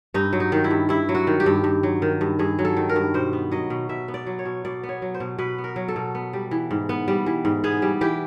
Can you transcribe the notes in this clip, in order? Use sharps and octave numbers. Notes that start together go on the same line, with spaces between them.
G2 D#4
F#3
D#4
D#3
E4
G2
G2 E4
F#3
F#4
D#3
G4
G2
G2
F#3
D#3
G2
G2 G#4
F#3
A4
D#3
A#4
G2
B2 C5
B3
F#3 D#5
B2
B2 E5
B3
D5
F#3
C#5
B2
B2 D5
B3
C#5
F#3
C5
B2
B2 B4
B3
A#4
F#3
A4
B2
B3
G3
E3
G#2
B3
G3
E3
G#2
B3 G#4
G3
E3 G4